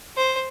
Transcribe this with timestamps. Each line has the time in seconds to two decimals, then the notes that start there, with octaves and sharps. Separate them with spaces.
0.16 C5